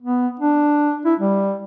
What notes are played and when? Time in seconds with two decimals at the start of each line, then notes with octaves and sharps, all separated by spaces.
0.02 B3
0.40 D4
1.05 E4
1.20 G3